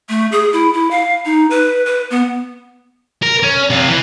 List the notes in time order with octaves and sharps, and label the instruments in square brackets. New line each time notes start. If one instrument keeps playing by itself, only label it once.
[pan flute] A3
G#4
E4
E4
F5
D#4
B4
B4
B3
[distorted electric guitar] A#4
C#4
C3 F4
E3